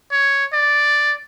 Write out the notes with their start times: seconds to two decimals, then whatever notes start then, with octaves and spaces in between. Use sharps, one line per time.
0.12 C#5
0.53 D5